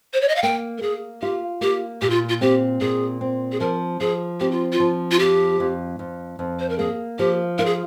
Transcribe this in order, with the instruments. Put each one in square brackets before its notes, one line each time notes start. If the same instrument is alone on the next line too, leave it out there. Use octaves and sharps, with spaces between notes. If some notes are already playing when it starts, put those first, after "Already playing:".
[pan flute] C5
C#5
D#5
F5
[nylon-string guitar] A#3 [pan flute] G5
[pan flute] A#4
[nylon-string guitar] A#3 [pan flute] G#4
[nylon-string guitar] F4 [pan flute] G4
[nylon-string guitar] A#3 [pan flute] G4
[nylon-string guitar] A#2 [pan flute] G4
[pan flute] F4
F4
[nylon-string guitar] C4 [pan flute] G4
[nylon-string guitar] A#2 [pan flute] G#4
[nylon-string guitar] C4
[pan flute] G#4
[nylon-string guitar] F3 [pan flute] A#4
[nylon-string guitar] F3 [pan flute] G#4
[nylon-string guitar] C4 [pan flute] G4
[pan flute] F4
F4
[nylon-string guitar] F3
[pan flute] F4
[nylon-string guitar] F2 [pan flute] G4
[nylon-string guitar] F2
F2
F2
[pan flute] C5
A#4
[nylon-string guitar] A#3 [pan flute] G#4
[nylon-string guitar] F3 [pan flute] G4
[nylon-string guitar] F4 [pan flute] A#4
[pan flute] G#4